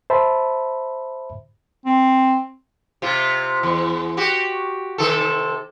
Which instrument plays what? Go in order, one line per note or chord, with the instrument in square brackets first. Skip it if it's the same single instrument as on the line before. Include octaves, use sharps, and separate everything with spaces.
[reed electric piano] C5 E5 A5 B5
[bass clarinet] C4
[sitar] C3 F4
E2
F#4 G4
C3 D#3 A4